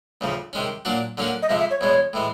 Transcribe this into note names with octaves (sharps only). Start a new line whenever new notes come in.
D2 C#3 F3
C3 D#3 G#3 C#4
A#2 F#3 A#3 D4 F#4
D3 F#3 A#3 C#4 F#4
D#5
F2 C3 F3 G#3 E5
E5
C#5
E2 B2 G#3 C#5
A2 E3 G#3